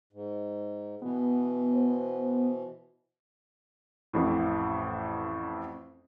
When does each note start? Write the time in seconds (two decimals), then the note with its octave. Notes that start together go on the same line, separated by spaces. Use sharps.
0.13 G#2
1.02 B2 E3 B3
1.74 C5
4.13 A1 F2 A2